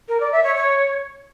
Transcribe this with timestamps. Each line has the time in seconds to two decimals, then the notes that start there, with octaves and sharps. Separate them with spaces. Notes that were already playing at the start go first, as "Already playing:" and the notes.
0.08 A#4
0.20 D5
0.32 E5
0.43 C#5
0.55 C#5